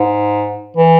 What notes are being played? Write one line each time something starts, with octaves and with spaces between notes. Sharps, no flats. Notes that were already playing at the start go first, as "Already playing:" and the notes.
Already playing: G#2
E3